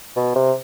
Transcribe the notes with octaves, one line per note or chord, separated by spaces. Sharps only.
B2
C3